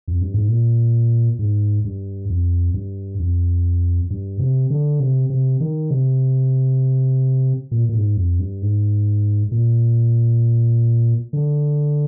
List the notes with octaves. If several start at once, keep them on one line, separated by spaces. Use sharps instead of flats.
F2
G2
G#2
A#2
G#2
G2
F2
G2
F2
G2
C3
D3
C3
C3
D#3
C3
A#2
A#2
G#2
F2
G2
G#2
A#2
D3